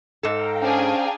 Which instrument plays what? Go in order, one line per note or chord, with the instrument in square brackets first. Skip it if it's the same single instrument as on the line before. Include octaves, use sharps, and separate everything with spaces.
[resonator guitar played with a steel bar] G#2 A4 [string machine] F5 G5 A#5
[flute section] C#4 C5 [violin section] D4 G#4